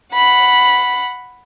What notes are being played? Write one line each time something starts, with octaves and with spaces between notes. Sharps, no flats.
F#5 B5